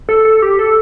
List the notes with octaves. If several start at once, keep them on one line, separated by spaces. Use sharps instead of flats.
A4
A4
G4
A4